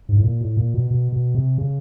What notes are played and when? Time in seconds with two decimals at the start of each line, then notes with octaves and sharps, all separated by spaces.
0.09 G#2
0.17 A2
0.24 A#2
0.41 A2
0.57 A#2
0.74 B2
0.91 B2
1.12 B2
1.35 C3
1.58 C#3